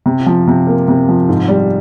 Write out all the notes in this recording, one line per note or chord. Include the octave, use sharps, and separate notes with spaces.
C3
F3
C3
A#3
C3
F3
G#2
G3